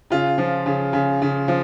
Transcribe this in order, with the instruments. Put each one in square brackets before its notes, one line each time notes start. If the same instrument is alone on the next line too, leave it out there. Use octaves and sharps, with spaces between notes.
[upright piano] C#3 F4
F3
C#3
C#3
C#3
F3